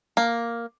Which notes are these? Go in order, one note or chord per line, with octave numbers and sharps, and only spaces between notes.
A#3